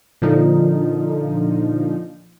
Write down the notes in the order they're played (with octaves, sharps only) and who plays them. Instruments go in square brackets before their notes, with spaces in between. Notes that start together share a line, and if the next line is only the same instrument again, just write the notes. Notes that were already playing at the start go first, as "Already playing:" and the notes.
[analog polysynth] A#2 D3 F3 D#4